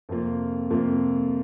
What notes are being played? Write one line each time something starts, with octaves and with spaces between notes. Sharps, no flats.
F2 C3 A#3 F4
F2 C3 A#3 F4